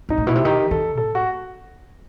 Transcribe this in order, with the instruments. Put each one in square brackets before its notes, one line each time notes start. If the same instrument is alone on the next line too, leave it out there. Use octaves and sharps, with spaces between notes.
[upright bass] G2 [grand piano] D#4
[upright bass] A2
[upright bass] B2 [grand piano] E4
[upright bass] C3
[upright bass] D#3 [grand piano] G4
[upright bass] D#3 [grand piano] A4
[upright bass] A2 [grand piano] A4
[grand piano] F#4